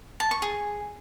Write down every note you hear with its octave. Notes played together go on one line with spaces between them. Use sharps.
A5
C#6
G#4